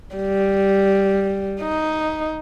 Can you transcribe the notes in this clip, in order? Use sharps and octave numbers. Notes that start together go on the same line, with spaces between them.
G3
D#4